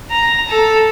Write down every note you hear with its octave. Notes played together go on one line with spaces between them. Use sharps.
A#5
A4